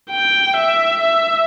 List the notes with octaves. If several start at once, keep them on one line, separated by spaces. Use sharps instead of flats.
G5
E5
E5